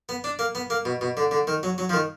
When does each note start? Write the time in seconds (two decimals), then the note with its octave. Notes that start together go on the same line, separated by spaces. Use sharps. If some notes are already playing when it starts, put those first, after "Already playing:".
0.09 B3
0.24 D4
0.39 A#3
0.55 B3
0.70 A#3
0.85 B2
1.01 B2
1.17 D3
1.31 D3
1.47 D#3
1.63 F#3
1.78 F#3
1.89 F3
1.93 D#3